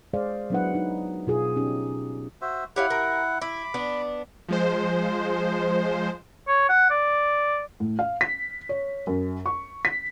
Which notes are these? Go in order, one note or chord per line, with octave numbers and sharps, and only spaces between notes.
G#3 G#4 C5 D5 F5
F#3 B3 D4 E4 B4 F#5
D#4
B2 F4 G#4
C#4 D#4 G4
F#4 C5 E5
E4 G4 C#5 F5 F#5
A#4
E4 B5 D6
B3 D4
F3 G#3 C5
C#5
F#5
D5
A2
F5
B6
C#5
F#2
C#6
B6